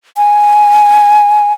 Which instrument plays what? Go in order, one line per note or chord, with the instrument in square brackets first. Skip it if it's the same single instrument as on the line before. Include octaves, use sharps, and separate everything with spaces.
[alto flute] G#5